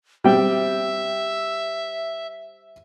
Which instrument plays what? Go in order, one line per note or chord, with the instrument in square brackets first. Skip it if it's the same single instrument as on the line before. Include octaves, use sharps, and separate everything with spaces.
[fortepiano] G3 C4 G5 [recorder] E5